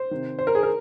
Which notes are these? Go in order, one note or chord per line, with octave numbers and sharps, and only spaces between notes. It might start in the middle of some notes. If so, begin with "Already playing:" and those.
Already playing: C5
C3 D#3
C5
A#4
G#4
A#4